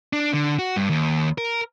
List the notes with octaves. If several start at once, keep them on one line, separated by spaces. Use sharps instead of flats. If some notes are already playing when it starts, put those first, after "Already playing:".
D4
D3
F#4
G2
D#2
A#4